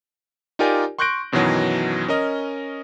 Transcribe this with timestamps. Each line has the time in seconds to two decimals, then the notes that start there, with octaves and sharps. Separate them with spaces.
0.59 D#4 F4 G4 A#4 D5 G#5
0.99 C6 C#6 F#6 G6 A#6 D7
1.32 F#2 B2 D#3 E3 F#3
2.08 C#4 A#4 D#5